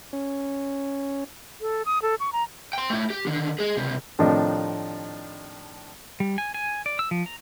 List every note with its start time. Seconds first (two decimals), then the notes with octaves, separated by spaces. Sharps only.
0.13 C#4
1.61 A4
1.86 D#6
2.02 A4
2.20 C#6
2.33 A#5
2.73 G5 C6
2.90 A3 E4
3.10 G4
3.27 D3 D#3
3.59 G#3 G#4
3.77 C#2 C3
4.19 A2 C3 D#3 F3 D4 D#4
6.20 G3
6.38 G#5
6.54 G#5
6.86 D5
6.99 E6
7.11 F3
7.26 A#5